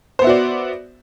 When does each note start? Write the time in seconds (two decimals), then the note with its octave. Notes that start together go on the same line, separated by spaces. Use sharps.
0.19 C5
0.22 B3
0.24 E5
0.27 F#4
0.29 D5